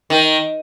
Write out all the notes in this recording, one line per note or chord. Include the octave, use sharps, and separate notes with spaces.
D#3